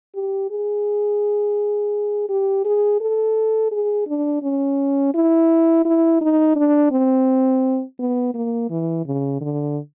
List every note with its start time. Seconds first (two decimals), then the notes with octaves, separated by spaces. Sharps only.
0.15 G4
0.51 G#4
2.29 G4
2.65 G#4
3.01 A4
3.72 G#4
4.07 D4
4.43 C#4
5.14 E4
5.85 E4
6.21 D#4
6.56 D4
6.91 C4
7.99 B3
8.34 A#3
8.70 E3
9.06 C#3
9.41 D3